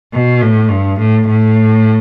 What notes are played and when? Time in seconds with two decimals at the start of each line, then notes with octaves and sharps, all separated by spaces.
0.13 B2
0.42 A2
0.70 G2
0.99 A2
1.28 A2